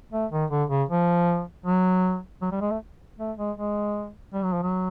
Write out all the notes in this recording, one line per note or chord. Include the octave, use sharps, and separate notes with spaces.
A3
D#3
D3
C#3
F3
F#3
F#3
G3
G#3
A3
A3
G#3
G#3
G3
F#3
F3
F#3